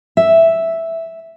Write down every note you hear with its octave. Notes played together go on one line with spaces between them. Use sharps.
E5